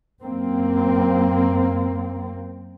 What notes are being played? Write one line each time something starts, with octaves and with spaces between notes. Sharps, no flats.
F#2 A#3 C4